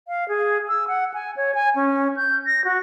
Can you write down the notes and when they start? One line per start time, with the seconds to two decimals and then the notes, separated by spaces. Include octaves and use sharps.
0.08 F5
0.29 G#4
0.68 E6
0.88 F#5
1.14 G#5
1.37 C#5
1.55 G#5
1.76 C#4
2.17 G6
2.46 A#6
2.65 F#4